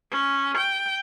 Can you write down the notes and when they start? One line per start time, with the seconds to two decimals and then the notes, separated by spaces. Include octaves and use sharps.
0.12 C#4
0.58 G5